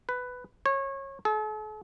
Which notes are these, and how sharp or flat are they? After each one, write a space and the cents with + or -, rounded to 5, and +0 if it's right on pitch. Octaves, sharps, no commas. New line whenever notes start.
B4 +10
C#5 -25
A4 -45